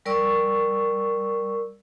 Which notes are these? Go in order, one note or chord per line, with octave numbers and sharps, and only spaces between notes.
G3 A#4 D5 C#6 E6